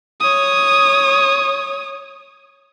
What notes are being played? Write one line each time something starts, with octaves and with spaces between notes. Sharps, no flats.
C#5 D#6